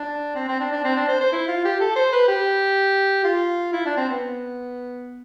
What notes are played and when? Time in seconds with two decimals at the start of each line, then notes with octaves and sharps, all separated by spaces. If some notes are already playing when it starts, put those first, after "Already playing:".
Already playing: D4
0.35 C4
0.48 C4
0.60 D4
0.72 D4
0.84 C4
0.97 D4
1.08 C5
1.21 C5
1.32 E4
1.48 F4
1.65 G4
1.80 A4
1.96 C5
2.13 B4
2.28 G4
3.24 F4
3.73 E4
3.86 D4
3.97 C4
4.10 B3